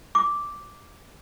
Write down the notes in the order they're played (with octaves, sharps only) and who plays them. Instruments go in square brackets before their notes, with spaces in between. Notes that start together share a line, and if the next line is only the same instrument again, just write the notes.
[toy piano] D6